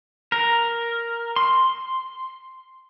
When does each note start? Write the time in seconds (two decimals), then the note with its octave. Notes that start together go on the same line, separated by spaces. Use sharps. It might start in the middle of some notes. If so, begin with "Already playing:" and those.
0.32 A#4
1.36 C6